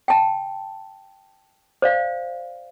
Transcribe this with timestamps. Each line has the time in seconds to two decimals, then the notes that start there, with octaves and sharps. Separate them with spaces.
0.08 G5 A5
1.82 C5 D5 F5